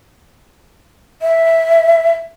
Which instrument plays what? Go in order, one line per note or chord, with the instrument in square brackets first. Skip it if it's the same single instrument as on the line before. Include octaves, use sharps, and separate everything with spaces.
[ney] E5